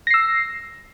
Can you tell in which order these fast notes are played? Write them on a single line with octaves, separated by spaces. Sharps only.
A#6 C7 E6